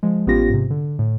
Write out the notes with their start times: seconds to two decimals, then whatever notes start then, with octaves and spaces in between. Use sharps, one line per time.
0.03 F3 G#3
0.27 A1 B3 C#4 F4 G4 A#6
0.50 G#2 C3
0.70 D3
0.99 A2